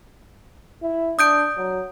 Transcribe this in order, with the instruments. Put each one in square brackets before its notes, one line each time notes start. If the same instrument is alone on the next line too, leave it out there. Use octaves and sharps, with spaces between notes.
[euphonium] E4
[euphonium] D4 [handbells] D#6 G6 D7
[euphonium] F#3